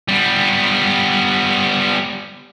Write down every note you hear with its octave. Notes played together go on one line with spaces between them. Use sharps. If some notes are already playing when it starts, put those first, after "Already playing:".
G3 B3